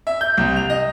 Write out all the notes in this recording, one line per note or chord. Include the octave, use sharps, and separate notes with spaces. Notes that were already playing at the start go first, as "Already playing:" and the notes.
E5
G6
C2
F7
D#5